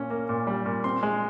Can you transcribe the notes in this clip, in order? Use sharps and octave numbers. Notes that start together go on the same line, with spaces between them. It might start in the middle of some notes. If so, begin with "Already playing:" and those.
Already playing: A#2 A#3 C#4
A#3
A#2
G3
A#2
C4 C6
G#3